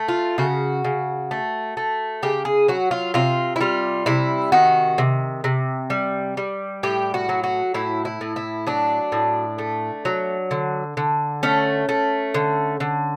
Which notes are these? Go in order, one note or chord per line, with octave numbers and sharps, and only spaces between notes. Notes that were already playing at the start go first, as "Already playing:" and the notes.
Already playing: A3
F4
C#3 F#4
C#3
A3
A3
C#3 G4
G#4
F#3 F#4
F4
C3 F4
E4
G3 F4
C3 E4
D#3 F#4
C3
C3
G3
G3
A2 G4
F#4
F#3
F#4
A2 E4
E4
A2
E4
F#3 D4
A2
A3
F#3
D3
D3
A3 C#4
A3
D3
D3